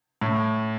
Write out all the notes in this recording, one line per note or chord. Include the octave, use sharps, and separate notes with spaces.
A2